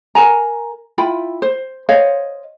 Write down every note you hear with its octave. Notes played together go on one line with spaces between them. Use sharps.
A#4 G#5 A#5
E4 F4 G5 B5
C5
C5 C#5 D#5 F5